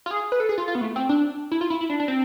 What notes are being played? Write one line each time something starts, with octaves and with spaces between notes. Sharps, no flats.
F4
G#4
B4
A4
G#4
F4
F4
B3
A3
C4
D4
E4
F4
E4
E4
D4
D4
C4